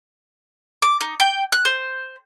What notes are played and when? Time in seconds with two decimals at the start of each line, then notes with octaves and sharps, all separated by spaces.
0.82 D6
1.01 D#4
1.20 G5
1.52 F#6
1.65 C5